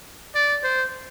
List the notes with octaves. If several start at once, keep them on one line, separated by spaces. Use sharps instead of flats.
D5
C5